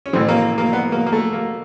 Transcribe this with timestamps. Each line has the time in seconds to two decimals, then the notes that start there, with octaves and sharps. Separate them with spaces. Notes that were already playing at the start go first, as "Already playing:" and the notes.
0.06 C#4
0.13 A1 A2 E3 C4
0.29 A#3
0.58 A#3
0.73 B3
0.92 A#3
1.06 A#3
1.12 A3
1.33 A#3